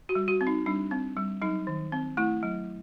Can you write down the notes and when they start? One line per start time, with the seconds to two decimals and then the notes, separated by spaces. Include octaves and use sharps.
0.09 F#4
0.15 G3
0.28 F#4
0.41 C4
0.47 D#4
0.66 G3 D4
0.91 C4
1.17 G3
1.42 F#3 D#4
1.67 D#3
1.92 C4
2.17 A3 E4
2.43 F#3